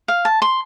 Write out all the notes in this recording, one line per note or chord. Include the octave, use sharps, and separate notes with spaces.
F5
A5
C6